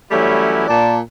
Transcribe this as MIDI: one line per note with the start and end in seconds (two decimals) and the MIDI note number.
0.10 0.65 52
0.10 0.65 54
0.10 0.65 55
0.10 0.65 57
0.10 0.65 61
0.10 0.65 64
0.67 0.98 46
0.67 0.98 74
0.67 0.98 81